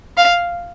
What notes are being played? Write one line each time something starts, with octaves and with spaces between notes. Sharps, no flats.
F5